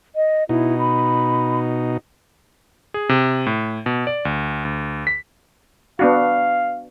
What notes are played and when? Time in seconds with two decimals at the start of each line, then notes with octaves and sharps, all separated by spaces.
0.16 D#5
0.49 B2 D#4 E4
0.79 B5
2.94 G#4
3.09 C3
3.46 A2
3.86 B2
4.07 D5
4.25 D2
4.65 D2
5.07 B6
5.99 B3 D4 F#4 F5